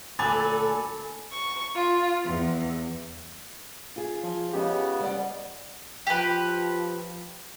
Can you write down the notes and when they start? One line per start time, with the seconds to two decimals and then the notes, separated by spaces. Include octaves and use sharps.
0.19 D2 A#2 F#3 A4 G#5 B5 D6 A6
1.32 C#6
1.75 F4
2.25 E2
3.96 F4 G#4
4.23 F3
4.54 C#2 C#3 B3 G4 D#5
5.00 G3 D5 F#5
6.07 F3 G4 B4